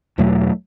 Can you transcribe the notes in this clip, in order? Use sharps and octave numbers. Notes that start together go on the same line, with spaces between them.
E2 B2 F#3 A3